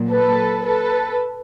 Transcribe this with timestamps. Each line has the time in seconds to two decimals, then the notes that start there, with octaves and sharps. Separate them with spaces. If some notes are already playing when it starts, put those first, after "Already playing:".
Already playing: A#2 F#3
0.11 A4 B4
0.65 A4 B4